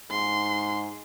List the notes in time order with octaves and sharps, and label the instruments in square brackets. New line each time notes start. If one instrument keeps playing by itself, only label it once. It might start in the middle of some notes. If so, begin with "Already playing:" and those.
[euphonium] G#2 [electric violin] C6